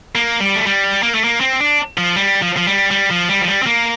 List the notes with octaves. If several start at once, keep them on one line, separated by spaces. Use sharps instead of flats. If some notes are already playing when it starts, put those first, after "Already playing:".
A#3
G3
A3
G3
A#3
A3
A#3
C4
D4
F3
G3
F3
F3
G3
G3
F3
G3
F3
G3
C4
A#3